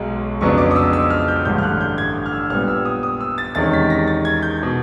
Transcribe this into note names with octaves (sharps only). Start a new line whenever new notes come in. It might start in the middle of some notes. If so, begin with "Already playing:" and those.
Already playing: B1 B2 G#3
F2 C#3 F#3 B3 D4 C#6
D6
D#6
E6
E6
F6
G6
A1 G2 D3 G6
F6
F#6
G6
G#6
F6
E6
A#2 G3 B3 F6
E6
D#6
D#6
E6
A6
E2 C3 D#3 G#3 C#4 A6
B6
A#6
A6
G#6
G6
B2